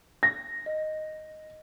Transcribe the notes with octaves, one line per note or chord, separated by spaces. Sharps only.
A#6
D#5